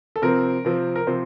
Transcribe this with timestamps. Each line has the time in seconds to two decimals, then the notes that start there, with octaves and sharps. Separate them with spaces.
0.16 A4
0.22 C3 F3 C4 A#4
0.65 C3 F3 C4
0.96 A#4
1.07 C3 F3 C4 C5